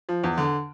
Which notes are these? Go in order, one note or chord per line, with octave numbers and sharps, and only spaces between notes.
F3
E2
D3